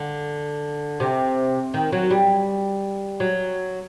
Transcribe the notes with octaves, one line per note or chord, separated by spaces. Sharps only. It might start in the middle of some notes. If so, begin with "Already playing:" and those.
Already playing: D3
C3
D#3
F#3
G3
F#3